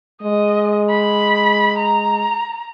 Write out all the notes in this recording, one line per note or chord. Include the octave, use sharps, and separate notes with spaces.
G#3 D#5
B5
A#5